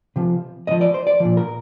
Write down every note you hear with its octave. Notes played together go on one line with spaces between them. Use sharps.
C3 F3
A2 F3 D#5
D5
C5
D5
A#2 F3
A#4